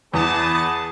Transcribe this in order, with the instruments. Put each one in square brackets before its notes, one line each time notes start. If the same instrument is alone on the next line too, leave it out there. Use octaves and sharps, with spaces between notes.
[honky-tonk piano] E2 [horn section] B3 G#4 A5